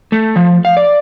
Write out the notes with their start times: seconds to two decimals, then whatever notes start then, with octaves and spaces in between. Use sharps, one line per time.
0.12 A3
0.36 F3
0.65 F5
0.77 D5